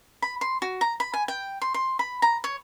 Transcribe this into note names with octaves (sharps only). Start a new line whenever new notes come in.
B5
C6
F#4
A#5
B5
G#5
G5
C6
C6
B5
A#5
C#5